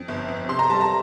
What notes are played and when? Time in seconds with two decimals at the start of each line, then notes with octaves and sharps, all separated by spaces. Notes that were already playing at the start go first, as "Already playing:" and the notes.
Already playing: F2
0.08 G1
0.28 F2
0.49 C3 C6
0.59 A#5
0.70 G3 A5
0.81 A#5